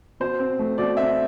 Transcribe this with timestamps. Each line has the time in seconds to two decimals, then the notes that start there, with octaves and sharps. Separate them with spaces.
0.20 B2 C5
0.39 C4
0.59 A3
0.78 B2 D5
0.97 C4 E5